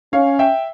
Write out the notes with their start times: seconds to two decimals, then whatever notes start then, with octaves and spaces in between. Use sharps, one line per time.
0.13 C#4 C#5 F5
0.39 E5 G5